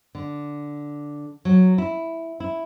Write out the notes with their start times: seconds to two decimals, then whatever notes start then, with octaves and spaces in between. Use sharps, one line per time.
0.15 D3
1.45 F#3
1.78 E4
2.40 E4